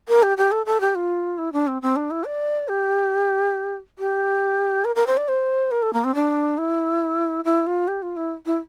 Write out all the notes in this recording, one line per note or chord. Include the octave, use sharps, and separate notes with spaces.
A#4
G4
G4
A4
A4
G4
F4
E4
D4
C4
C4
D4
E4
D5
G4
G4
A#4
A#4
C5
D5
C5
A#4
A4
A#3
C4
D4
E4
E4
F4
G4
F4
E4
E4